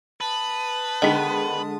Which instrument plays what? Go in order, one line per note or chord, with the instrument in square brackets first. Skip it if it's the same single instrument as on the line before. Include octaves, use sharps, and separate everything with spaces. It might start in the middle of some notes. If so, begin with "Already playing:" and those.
[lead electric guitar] B4 [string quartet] A5 D#6
[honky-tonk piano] D3 G#3 B6 [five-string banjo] D#3 B3